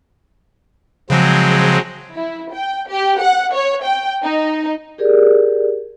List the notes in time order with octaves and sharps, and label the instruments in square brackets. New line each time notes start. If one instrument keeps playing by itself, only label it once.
[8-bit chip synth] C#3 F3 [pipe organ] F#3 G#3 C4
[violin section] E4
G5
G4
F#5
C#5
G5
D#4
[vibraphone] G4 G#4 A#4 D5